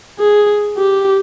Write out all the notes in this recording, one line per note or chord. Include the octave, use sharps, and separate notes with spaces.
G#4
G4